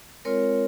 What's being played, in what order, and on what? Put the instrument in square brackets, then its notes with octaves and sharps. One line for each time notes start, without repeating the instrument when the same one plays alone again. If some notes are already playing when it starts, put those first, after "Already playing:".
[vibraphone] G#3 C4 F4 A#4 C#5